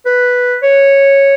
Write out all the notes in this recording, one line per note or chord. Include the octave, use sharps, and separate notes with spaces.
B4
C#5